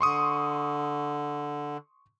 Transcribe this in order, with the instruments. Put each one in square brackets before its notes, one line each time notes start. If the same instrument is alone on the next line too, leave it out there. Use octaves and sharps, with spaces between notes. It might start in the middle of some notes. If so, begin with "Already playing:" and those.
[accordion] D3 [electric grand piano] C6 C#6 D#6